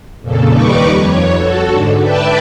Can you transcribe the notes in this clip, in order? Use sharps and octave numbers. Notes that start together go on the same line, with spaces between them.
F2 A#2 C#3 A4
D#2 G3 D#4 B4 C#6 D6
F2 C#5
F#4 A4
G#2 D3
B4 D5 E5 G5 A5